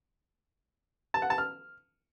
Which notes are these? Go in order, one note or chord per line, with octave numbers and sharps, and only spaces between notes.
A5
F#5
A5
F6